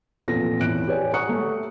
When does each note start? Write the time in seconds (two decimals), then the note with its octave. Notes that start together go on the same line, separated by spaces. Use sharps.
0.28 A1 F2 A#2 B3 A4 A#6
0.60 E2 A2 F#6 D7
0.88 G4 G#4 B4 C#5 D5 G#5
1.14 F#5 A#5 C#6 D#6 F#6 C#7
1.29 A3